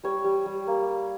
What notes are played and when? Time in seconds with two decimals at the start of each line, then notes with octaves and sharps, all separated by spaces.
0.04 G3 C#5
0.24 G3
0.46 G3
0.67 A#3